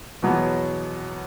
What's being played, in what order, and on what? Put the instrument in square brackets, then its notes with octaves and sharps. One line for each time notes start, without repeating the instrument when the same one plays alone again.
[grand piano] E2 B2 F#3 B3